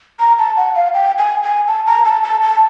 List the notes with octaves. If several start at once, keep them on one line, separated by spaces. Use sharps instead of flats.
A#5
A5
F#5
F5
G5
G#5
G#5
A5
A#5
A5
A5
A5